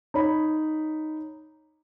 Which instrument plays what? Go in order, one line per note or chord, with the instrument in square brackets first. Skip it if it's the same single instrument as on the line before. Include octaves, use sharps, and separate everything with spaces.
[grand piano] D#4 C#5 B5